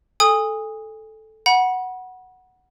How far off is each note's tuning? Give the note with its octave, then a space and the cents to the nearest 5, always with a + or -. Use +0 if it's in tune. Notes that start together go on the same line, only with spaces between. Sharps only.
A4 -10 G#5 -30 D#6 +0
F#5 +0 B5 -35